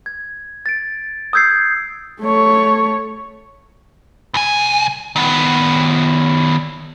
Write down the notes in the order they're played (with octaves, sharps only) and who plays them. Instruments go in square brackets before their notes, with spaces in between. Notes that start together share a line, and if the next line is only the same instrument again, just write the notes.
[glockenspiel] G#6
A6 D7
D#6 E6 G6 G#6 C7
[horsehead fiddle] A3 C#5
[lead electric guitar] C2 G#5
D#3 B3